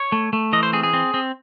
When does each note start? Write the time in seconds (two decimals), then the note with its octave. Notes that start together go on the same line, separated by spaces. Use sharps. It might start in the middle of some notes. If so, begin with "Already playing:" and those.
Already playing: C#5
0.12 A3
0.33 A3
0.53 E3 D#5
0.63 C5
0.73 C4 G#4
0.83 G#4
0.93 C4
1.14 C4